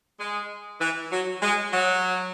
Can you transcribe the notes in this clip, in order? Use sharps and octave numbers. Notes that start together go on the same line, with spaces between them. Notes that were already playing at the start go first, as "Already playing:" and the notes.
G#3
E3
F#3
G#3
F#3